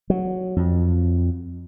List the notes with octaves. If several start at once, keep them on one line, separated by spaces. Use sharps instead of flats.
F#3
F2